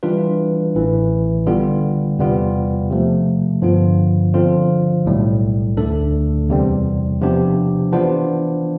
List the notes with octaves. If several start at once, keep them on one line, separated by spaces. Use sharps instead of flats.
E3 G3 D4 F4 B4
A1 A2 E3
D3 G3 B3 F4
E2 C3 G3 B3 F4
C3 F3 A3
G2 D3 F3 B3 F4
D3 F3 C4 F4 C5
B1 A2 G3
D2 D3 A3 D4 A4
E2 C3 G3 C4
C3 F3 B3 D4 G4
E3 B3 D4 F4 C5